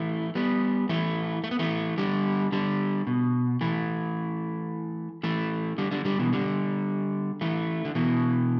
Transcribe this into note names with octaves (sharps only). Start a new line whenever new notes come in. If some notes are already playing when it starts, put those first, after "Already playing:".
Already playing: E3 A3
G3 B3
E3 A3
A3
B3
E3 A3
D3 G3
D3 G3
B2
E3 A3
E3 A3
D3 G3
D3 G3
D3 G3
B2 E3
D3 G3
E3 A3
D3
B2 E3